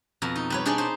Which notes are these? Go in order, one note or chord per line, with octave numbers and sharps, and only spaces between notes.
F2 B2 A#5
D#4
G3 B4 C#5
D4 D#4 G#4 B4 C#5 D5
D#4 C5